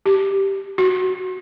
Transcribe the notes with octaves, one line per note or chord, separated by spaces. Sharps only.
G4
F#4